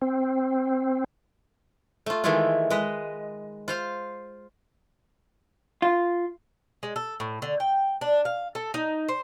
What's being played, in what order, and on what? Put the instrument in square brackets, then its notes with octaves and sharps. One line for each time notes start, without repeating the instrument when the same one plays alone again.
[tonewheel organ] C4
[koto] A3 F4
D#3 E3 G#3 A3 E4 F4
G#3 B4 D#5
F4 C5 F5
[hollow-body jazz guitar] F4
[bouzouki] G#3
A4
A2
D3
G5
D4
F5
A4
D#4
C5